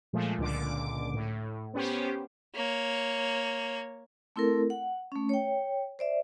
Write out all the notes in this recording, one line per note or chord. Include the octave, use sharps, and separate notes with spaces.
A#2 F3 G#3 A3
C#2 A#2 D3 D6
A2
B3 C#4 G4 C5
A#3 C#5
A3 C4 E4 A4 A#4
F#5
A3 C#4
C#5 G5
C5 D5 E5